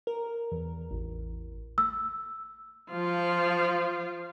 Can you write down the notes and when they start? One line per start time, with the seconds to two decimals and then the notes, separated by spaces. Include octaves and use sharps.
0.07 A#4
0.52 E2
0.91 A1
1.78 E6
2.90 F3 F4